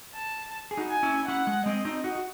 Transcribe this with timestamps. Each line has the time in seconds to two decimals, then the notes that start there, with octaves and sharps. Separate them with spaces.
0.14 A5
0.71 G#4
0.77 D#4 F#4
0.90 G#5
1.03 C#4 E4
1.28 C#4 E4 F#5
1.47 G#3
1.66 G#3 C4 D#5
1.85 C4 D#4
2.04 D#4 F#4
2.15 F#4